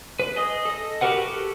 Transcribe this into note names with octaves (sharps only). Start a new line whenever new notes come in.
B4
G#4 D#5 D#6
A4 D#5
F#4 G4 A#4 B4 F#5
G4 A4